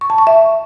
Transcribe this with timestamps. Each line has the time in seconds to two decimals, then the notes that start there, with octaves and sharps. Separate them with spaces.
0.01 C#6
0.10 A5
0.18 C#6
0.27 E5